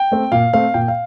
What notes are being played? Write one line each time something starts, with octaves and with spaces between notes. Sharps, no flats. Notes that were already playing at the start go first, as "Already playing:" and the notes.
Already playing: G5
A3 C4
A#2 F5
A3 C4 F5
A#2 G5
F5